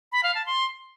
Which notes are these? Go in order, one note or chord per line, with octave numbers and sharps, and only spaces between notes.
B5
F5
A5
C6